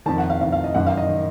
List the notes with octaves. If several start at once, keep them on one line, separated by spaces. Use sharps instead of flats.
F2 D#3 A5
F#5
F5
F2 D#3 F5
F5
D#5
F#2 D#3 F#5
F5
D#5
D#3